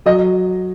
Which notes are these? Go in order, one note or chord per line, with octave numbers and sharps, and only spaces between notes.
F#3 D#5